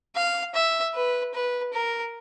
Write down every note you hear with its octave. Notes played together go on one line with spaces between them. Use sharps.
F5
E5
B4
B4
A#4